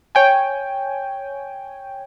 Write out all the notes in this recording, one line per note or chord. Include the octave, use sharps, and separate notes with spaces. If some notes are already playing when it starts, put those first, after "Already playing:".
C#5 G5 G#5